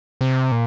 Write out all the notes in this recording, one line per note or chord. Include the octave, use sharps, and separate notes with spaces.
C3
A#2